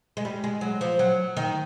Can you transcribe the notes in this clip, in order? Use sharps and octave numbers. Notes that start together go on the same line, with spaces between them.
G#3
G3
G#3
F#3
F3
F#3
D#3